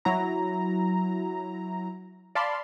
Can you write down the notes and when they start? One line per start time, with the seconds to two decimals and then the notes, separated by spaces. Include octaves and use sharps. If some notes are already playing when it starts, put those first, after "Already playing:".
0.05 F#3 E4 A#5
2.35 D5 F5 A5 B5 C6